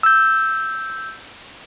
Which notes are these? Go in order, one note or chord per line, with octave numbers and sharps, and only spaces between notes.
E6 G6